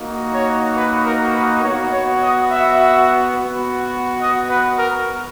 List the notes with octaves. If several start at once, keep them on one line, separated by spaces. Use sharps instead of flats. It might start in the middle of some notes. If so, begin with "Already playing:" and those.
Already playing: A#3 D#4 F#4
C#5
B4
A#4
B4
B3 F#4 C#5
C#5
D#5
E5
B3 F#4
D#5
B4
A#4